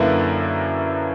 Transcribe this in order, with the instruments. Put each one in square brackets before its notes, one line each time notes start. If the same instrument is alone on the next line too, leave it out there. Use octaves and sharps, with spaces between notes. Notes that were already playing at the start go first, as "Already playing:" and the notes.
Already playing: [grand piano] F#2 D3 A#3 E4 B4